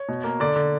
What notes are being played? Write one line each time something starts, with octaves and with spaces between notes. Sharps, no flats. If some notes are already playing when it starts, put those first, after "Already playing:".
Already playing: C#5
B2
A#3
D3 D5
D3